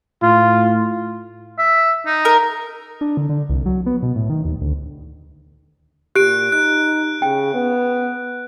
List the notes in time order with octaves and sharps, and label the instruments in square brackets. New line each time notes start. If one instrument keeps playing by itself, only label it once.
[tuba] A2 [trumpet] F4
[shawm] E5
D#4
[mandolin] A#4
[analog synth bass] D4
D3
D3
C2
F#3
B3
B2
A2
D#3
D#2
D2
[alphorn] A#2 [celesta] G4 [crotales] F#6 D7
[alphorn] D#4 [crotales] F#6
[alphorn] C#3 [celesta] G5
[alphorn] B3